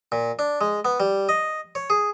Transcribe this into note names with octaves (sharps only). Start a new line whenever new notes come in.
A#2
D4
G#3
B3
G3
D#5
C#5
G#4